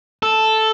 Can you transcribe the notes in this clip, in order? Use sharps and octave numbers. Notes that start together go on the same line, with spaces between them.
A4